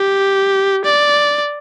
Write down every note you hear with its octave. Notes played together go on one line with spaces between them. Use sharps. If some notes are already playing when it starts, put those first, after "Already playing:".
Already playing: G4
D5